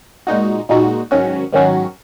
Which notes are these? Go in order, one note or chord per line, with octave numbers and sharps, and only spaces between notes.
A#2 G#3 D#4 F#4
A#2 G#3 D#4 F#4
G#2 D#3 F#3 C#4 F#4
G#2 D#3 F#3 C#4 F#4